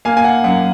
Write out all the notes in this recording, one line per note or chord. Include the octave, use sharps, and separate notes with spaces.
A#3 F5 G#5
G#5
F#5
F#2 F#5